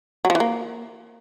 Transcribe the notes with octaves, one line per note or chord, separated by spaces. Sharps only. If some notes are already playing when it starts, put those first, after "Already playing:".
F#3
F3
E3
A#3